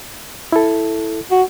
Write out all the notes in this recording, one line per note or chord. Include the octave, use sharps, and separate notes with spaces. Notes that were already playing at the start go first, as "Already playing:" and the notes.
E4 A4
F#4